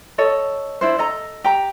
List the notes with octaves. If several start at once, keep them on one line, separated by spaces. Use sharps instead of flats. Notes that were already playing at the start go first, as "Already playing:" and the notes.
A4 C#5 D#5
D4 E4 C5
A4 D#5 A#5
G4 A#5